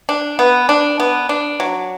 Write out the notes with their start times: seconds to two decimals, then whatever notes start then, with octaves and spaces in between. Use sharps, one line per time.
0.09 D4
0.39 B3
0.69 D4
1.00 B3
1.29 D4
1.60 F#3